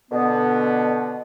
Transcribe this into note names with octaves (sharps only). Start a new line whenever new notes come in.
B2 D3 B3